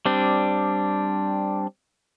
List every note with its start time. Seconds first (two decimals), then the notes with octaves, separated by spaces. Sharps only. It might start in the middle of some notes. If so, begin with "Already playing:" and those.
0.06 G3 C4 D4